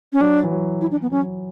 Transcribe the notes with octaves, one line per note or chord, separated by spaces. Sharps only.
C#4
F#3 D4
E3
F#3
E4
D4
B3
F#3 C#4